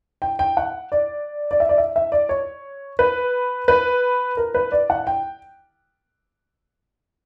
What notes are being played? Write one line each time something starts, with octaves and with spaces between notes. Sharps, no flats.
G5
G5
F#5
D5
D5
E5
D5
E5
E5
D5
C#5
B4
B4
A#4
B4
D5
F#5
G5